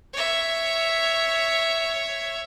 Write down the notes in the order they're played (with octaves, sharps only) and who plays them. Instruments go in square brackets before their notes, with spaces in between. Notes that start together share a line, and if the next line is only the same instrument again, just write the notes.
[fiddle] C#5 E5